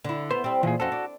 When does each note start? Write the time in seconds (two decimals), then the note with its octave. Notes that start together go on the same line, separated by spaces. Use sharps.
0.04 D3 E4
0.31 B3 C5
0.44 G3 C4
0.63 A#2 E3 G#4
0.80 F2 C4 C#4 F#4 A4
0.92 D4